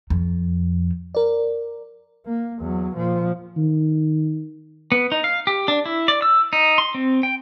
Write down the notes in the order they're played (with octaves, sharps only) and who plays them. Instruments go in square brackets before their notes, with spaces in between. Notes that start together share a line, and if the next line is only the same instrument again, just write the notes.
[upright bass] F2
[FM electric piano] A#4 D5
[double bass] A#3
E2 F#3
A#2 F3
[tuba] D#3
[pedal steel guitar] B3
D#4
F5
G4
D4
E4
D5
E6
D#4
C6
C4
G5